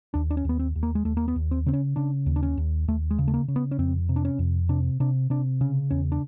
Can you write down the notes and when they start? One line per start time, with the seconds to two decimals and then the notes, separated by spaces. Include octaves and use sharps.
0.14 D#2 D4
0.31 D4
0.37 C#4
0.45 D#2 B3
0.59 C4
0.76 D#2
0.83 A#3
0.95 G#3
1.05 D#2 A3
1.17 A#3
1.28 B3
1.36 D#2
1.51 C4
1.66 C#3 C4
1.73 C#4
1.96 C#3 D4
2.26 D#2
2.36 D4
2.43 C#4
2.57 D#2
2.88 D#2 A3
3.11 G#3
3.19 C#3
3.28 A3
3.34 A#3
3.48 C#3
3.56 B3
3.71 C#4
3.79 F2 C4
4.09 C3
4.16 D4
4.25 C#4
4.39 F2
4.69 C3 D4
5.00 C3 D4
5.30 C3 D4
5.61 C#3 C#4
5.91 E2 C#4
6.12 D4